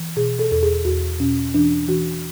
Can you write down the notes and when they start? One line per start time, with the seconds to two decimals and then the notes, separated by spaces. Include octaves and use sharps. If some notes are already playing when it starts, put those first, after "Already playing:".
Already playing: E3
0.16 B2 G#4
0.39 A4
0.51 E2 A4
0.63 G#4
0.85 E2 F#4
1.19 B2 C#4
1.54 E3 D4
1.88 E3 F#4